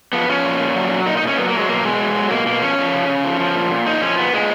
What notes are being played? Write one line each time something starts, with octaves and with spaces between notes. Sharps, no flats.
F3 B3
F3 C#4
A#2
A#2
F#3
F#3
A#2 D#4
D#4
A#2 C#4
F#3 B3
A#3
F#3
G#3
B2 A#3
B2 G#3
F#3
F#3
B2 A#3
B2 A#3
F3 C#4
F3
C#3
C#3
F3
F3
A#2
A#2
F3 D#4
F3 C#4
A#2 B3
A#2 G#3